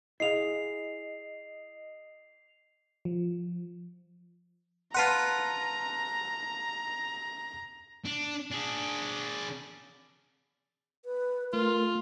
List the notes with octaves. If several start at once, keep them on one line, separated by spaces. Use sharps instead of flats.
E4 G#4 D#5 F5 C7 F7
F3
F4 B4 F#5 A5 A#5 C6
D4
D4 G#4
B4
A3 F4 A#4